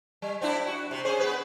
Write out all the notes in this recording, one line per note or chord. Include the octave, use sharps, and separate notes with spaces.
G3
C4 D4 E4
F#4
C3
C#4 G#4 C5
B3 B4